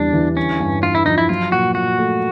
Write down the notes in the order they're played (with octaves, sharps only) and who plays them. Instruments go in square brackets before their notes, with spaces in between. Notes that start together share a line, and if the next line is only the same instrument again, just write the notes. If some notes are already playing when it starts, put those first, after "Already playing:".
Already playing: [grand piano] E2 C#3 G3 [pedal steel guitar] D4
[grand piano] E3
[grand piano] D3 [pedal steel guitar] C#4
[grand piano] G2
[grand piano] G2 [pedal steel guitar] F4
[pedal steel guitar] E4
[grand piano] F3 [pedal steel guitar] D#4
[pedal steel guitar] E4
[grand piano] F#3 [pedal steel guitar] F4
[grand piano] A#2 [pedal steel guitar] F#4
[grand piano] A#2 [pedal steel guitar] F#4
[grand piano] A3